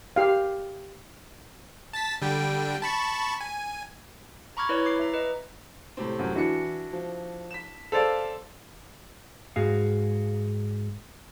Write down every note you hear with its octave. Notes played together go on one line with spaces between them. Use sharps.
G4 F5
A5 A6 B6
D3 G3 G5
A5 B5 C#6
G#5
A#5 B5 C#6 D6 F6 G#6
E4 B4 C#5 D5
D6 C7
E5 A#5
B4 D#5
A2 C3 C4
F#2
E3 D4 E4 F#4 C#7
F3
B6 E7
A4 C5 D5 F5 A6 F7
G#2 F#4 G#4 F5